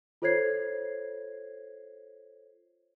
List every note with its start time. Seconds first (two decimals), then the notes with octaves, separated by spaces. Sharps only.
0.22 F4 A4 C5 C#5 G#6 C7